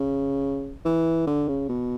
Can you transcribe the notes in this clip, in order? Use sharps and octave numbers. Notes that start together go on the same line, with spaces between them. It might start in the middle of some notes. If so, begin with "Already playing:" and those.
Already playing: C#3
E3
D3
C#3
B2